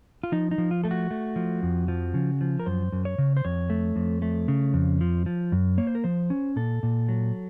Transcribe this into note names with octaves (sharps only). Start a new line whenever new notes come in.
F4
F3 D#4
D#4
F3
F4
A3 A4
F#4
A3
F3
F2
F3
C#3
F3
A#4
F#2 C5
F#2
C#5
C#3
C5
F2 C#5
A3
F2
A3
C#3
F2
F3
F3
F#2
A#3 C#5
C5
A#4
F3 C5
C#4
A#2 A4
A#2
F#3